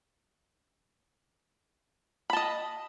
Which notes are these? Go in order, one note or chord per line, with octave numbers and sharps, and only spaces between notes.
D#5 A5 B5